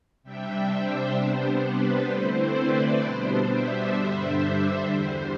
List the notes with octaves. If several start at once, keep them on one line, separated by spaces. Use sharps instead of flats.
C3 G3 D4 E5 G5
C5 E5
C3 G3 B3 D4 C5
B4
D3 A3 C4 E4 C5
B4 D5
B2 G3 B3 D4 C5
C5 E5
G2 D3 G3 D4
C5
E2 D3 G3